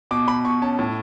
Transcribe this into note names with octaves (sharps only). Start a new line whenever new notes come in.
B2 D6
B2 B5
B2 C#6
C#4 A5
A2